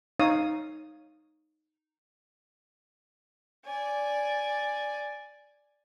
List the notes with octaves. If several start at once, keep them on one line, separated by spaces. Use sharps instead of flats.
D#4 C#5 F5 D#6
D5 G#5